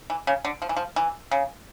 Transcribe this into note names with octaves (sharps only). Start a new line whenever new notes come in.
E3
C#3
D3
F3
E3
F3
E3
C#3